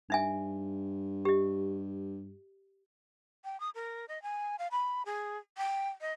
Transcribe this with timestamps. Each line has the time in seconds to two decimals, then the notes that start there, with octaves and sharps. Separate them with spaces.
0.10 G2 D#4 E5 G#5
1.25 G4 D#5
3.45 G5
3.60 D#6
3.75 A#4
4.09 D#5
4.23 G#5
4.59 F5
4.72 B5
5.06 G#4
5.58 G5
6.01 D#5